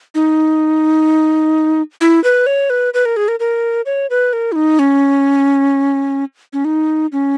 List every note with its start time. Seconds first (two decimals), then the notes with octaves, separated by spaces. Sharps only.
0.15 D#4
2.01 E4
2.24 B4
2.46 C#5
2.70 B4
2.94 B4
3.05 A#4
3.17 G#4
3.28 A#4
3.40 A#4
3.86 C#5
4.10 B4
4.33 A#4
4.52 E4
4.56 D#4
4.79 C#4
6.53 C#4
6.65 D#4
7.12 C#4